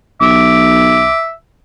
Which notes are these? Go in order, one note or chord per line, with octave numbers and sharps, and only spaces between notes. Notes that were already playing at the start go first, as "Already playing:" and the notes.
B1 E5 D6